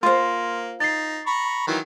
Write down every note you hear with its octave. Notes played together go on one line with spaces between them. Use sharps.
A#3 F4 C5 C6
D#4 A6 C7
A#5 B5 C#6
D#3 E3 F#3